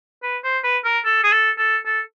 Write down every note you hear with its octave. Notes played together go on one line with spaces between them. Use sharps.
B4
C5
B4
A#4
A4
G#4
A4
A4
A4